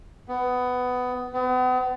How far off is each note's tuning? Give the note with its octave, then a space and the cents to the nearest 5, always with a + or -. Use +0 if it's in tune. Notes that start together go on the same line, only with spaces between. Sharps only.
B3 +15
B3 +40